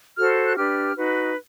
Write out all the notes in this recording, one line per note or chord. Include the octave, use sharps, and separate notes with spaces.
F#4 A4 C5 F6
F#6
D4 G4 B4 F6
D#4 F#4 B4